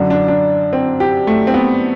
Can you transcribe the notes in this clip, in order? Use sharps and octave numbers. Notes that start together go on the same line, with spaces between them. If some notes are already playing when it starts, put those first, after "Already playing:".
Already playing: F#2 D3 D4
D4
D4
C4
G4
A3
C4
B3